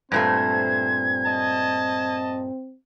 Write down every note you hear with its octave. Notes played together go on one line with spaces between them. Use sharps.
G2 A#2 A3 C4 C5 G#6
D#5 A5